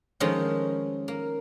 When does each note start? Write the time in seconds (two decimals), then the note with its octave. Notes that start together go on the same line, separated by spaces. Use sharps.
0.20 D#3 F3 G#3 A3 C#4 D#4
1.08 A#3